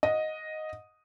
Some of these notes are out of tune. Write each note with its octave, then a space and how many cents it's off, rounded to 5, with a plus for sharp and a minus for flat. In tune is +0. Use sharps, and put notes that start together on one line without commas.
D#5 +0 F#5 -30